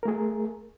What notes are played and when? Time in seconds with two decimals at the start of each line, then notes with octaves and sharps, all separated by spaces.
0.03 A#4
0.05 A3
0.08 G#4